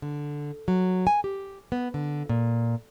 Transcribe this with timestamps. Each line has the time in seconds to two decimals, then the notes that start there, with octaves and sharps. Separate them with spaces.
0.02 D3
0.68 F#3
1.07 G#5
1.24 G4
1.72 B3
1.94 D3
2.29 A#2